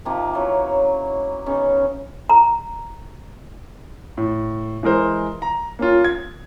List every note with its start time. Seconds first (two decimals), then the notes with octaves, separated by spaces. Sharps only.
0.05 C3 D#3 F3 A#3
0.34 E3 F#3 C#4
1.46 C#3 B3 C#4 D#4
2.30 A#5
4.17 A2
4.83 E3 G#3 A#4 C5
5.42 A#5
5.79 A#3 C#4 F4
6.04 G#6